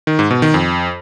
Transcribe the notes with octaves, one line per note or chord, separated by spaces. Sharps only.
D#3
G#2
B2
D#3
F2